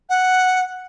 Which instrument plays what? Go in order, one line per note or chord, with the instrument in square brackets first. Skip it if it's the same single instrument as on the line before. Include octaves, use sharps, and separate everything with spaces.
[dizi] F#5